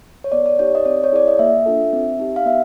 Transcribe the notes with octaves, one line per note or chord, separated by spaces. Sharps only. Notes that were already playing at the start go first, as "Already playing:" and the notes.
C#5
B3 D5
D5
D#4 G4 C#5
D#5
C4 D5
C#5
E4 G#4 D5
D#5
A#3 E5
D4 F4 A4
C4
D#4 G4
F5
B3 E5